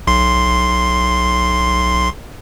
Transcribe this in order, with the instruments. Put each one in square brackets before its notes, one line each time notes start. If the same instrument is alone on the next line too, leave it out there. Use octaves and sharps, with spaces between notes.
[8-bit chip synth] B1 C6 C7